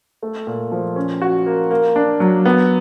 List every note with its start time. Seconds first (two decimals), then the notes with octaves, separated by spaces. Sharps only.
0.23 A3
0.47 A#2
0.72 F3
0.96 C#4
1.22 F#4
1.46 A#3
1.71 A#3
1.96 D4
2.20 F#3
2.45 B3